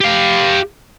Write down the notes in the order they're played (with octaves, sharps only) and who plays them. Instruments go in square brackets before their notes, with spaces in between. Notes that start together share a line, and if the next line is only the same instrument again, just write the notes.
[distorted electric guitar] G4 F5